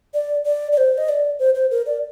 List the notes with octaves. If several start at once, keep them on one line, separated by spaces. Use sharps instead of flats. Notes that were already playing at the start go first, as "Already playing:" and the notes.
D5
D5
D5
C5
D#5
D5
C5
C5
A#4
D5